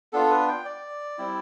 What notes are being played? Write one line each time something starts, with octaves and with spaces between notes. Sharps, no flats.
B3 D4 F4 A4
B4
G5
D5
G3 C4 E4